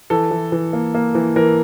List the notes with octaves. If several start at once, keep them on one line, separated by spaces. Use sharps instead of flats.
E3 A4
E3
E3
A#3
A#3
E3
E3 A#4